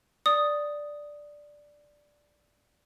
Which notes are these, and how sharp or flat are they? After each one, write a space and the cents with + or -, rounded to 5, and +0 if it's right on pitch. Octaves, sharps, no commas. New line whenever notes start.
D5 +0 D#6 +0